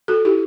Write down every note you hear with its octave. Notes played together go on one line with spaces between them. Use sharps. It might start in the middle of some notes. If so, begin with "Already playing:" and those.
F#4 A4
E4 G4